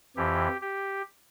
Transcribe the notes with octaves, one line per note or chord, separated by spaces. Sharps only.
F2 E3 G4
G4